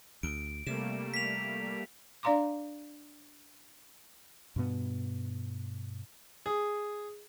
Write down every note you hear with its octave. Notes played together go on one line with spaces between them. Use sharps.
D2 D7
C3 G3 A3 A#3 E7
B6 F7
D4 D5 F5 A#5 C6 D6
G2 B2 B3
G#4